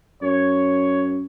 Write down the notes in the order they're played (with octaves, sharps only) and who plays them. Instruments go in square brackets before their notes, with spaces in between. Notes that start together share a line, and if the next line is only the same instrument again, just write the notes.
[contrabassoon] F#2 [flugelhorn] C#5